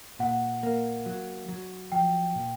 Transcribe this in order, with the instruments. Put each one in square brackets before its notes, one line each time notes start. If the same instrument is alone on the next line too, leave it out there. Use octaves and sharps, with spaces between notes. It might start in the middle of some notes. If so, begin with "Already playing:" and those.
[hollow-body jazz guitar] A#2 [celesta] F#5
[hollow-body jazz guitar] A#3
F#3
F#3
[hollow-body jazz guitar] F3 [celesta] G5
[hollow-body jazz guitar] A#2